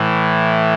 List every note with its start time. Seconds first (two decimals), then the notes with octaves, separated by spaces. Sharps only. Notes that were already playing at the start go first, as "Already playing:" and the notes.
Already playing: A2 E3